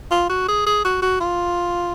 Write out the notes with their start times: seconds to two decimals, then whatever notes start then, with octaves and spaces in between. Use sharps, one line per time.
0.11 F4
0.29 F#4
0.48 G#4
0.66 G#4
0.84 F#4
1.02 F#4
1.21 F4